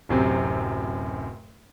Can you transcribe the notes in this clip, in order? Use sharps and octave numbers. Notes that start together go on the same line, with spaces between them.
D1 F#2 C3 C4